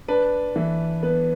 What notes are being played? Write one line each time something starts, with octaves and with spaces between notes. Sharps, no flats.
D4 B4
E3
B3 B4